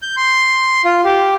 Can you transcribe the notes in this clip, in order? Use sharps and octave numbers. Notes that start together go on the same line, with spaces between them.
G6
C6
F4
G4